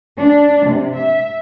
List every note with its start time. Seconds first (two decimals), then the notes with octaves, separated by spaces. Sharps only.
0.16 D4
0.66 C3
0.96 E5